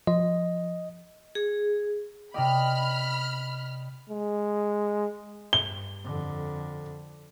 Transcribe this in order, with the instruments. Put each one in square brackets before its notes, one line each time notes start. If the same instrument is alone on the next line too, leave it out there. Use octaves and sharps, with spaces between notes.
[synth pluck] F3 [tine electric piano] D#5
[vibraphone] G#4
[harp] C3 D5 [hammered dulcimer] D#5 G5 [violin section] B5 F6
[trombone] G#3
[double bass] G2 [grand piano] G7
[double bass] F2 D3